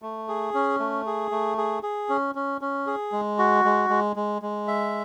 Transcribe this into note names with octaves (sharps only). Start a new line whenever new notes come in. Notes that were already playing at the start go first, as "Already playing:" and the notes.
A3
G#4
C#4
A3
G#4
A3
G#4
G#4
C#4
C#4
C#4
G#4
G#3
F#4
G#3
G#3
G#3
G#3
E5